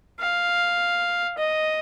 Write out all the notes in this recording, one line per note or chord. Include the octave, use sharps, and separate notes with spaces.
F5
D#5